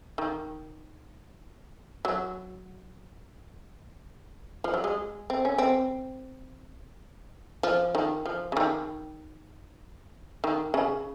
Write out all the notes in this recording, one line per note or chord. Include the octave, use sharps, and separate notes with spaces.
D#3
F#3
F3
F#3
G#3
C4
C#4
C4
F3
D#3
F3
C#3
D#3
D#3
C#3